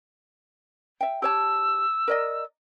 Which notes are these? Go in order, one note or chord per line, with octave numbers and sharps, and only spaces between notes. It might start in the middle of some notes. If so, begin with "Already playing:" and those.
E5 G5
G4 C#5 A5 E6
A#4 D5 D#5